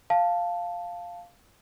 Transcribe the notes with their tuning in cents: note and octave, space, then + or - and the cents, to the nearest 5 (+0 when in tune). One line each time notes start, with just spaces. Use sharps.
F5 +0 A5 +0